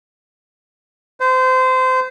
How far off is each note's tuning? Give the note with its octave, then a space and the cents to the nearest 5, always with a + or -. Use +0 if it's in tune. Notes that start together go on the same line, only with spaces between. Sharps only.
C5 -25